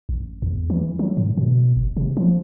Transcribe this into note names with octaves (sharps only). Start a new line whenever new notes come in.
A1
E2
E3
F#3
G#2
B2
F#1
C3
F3